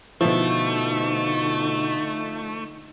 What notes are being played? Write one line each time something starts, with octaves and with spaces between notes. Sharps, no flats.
B2 D3 F3 A3 D#4 E4